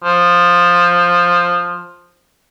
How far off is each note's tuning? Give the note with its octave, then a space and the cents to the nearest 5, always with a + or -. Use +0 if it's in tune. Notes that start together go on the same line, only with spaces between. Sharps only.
F3 +10